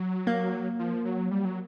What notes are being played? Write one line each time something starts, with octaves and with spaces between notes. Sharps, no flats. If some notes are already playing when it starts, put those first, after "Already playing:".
Already playing: F#3
A#3
F3
F#3
G3
F#3